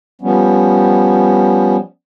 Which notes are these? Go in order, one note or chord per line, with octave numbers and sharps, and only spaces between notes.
F3 G3 B3 C#4